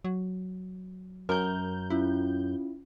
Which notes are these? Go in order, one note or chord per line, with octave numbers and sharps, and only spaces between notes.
F#3
F#2 A#4 G6
C#4 E4 F4